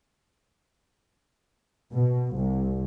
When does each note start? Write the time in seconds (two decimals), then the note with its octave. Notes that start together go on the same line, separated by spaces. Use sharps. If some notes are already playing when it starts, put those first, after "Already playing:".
1.92 B2
2.35 C2